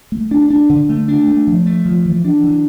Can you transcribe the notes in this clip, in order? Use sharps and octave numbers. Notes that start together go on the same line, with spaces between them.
A3
D4
D4
D3
A3
D4
A3
F3
A3
F3
E3
D4
E3